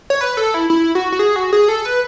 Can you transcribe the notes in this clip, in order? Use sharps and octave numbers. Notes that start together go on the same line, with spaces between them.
C#5
B4
A4
E4
E4
F#4
F#4
G#4
F#4
G#4
A4
B4